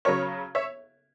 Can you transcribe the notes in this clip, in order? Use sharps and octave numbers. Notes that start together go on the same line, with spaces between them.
C#3 F#3 C#4 A#4 C#5
C#5 E5